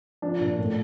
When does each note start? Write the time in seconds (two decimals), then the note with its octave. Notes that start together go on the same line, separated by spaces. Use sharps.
0.22 F3 D4
0.41 A#2
0.59 A2